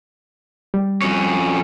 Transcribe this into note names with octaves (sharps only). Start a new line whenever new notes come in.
G3
F2 C#4